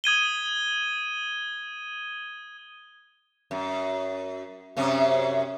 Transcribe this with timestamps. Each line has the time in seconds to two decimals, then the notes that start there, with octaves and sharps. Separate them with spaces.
0.04 D#6 G#6 D#7 G7
3.51 F#2
4.77 F#2 C3 C#4